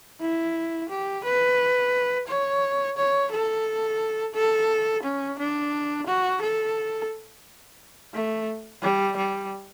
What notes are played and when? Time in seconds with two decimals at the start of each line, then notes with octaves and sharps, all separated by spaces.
0.20 E4
0.89 G4
1.24 B4
2.27 C#5
2.97 C#5
3.31 A4
4.34 A4
5.03 C#4
5.38 D4
6.06 F#4
6.41 A4
8.14 A3
8.82 G3
9.16 G3